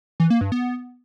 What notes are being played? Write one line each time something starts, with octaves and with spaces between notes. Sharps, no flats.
E3
A#3
G2
B3